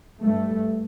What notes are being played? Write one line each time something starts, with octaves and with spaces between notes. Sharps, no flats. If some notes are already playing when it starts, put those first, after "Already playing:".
G2 A3